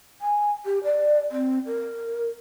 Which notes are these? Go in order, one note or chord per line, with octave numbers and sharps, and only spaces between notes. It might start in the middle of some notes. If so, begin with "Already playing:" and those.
G#5
G4
D5
C4
A#4